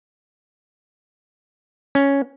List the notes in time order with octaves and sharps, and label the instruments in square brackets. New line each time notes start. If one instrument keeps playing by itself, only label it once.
[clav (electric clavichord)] C#4